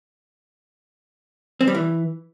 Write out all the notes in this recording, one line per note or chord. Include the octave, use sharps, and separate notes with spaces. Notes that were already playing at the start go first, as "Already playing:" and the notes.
C4
G3
E3